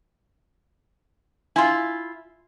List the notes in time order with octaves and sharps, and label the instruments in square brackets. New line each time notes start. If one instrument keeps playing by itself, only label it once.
[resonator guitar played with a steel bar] E4 F4 [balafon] G#5 C6